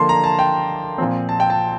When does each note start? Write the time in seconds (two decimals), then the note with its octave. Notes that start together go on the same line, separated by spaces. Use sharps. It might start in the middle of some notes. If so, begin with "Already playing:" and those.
Already playing: D3 F3 A#3 D4 A5 C6
0.09 A#5
0.24 A5
0.39 G5
0.98 A#2 F3 C4
1.29 A5
1.40 G5
1.50 A5